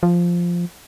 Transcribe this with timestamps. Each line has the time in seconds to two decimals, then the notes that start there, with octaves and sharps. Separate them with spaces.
0.03 F3